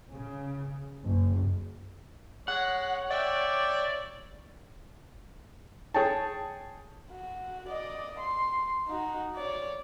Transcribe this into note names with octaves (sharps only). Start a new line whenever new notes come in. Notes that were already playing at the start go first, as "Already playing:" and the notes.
C#3
F#1
G#3 C#5 F#5
D5 E5 G5 D6
G#4 C#5 G5 A5
F#4
D5 D#5
C6
D#4 F#4
C#5 D5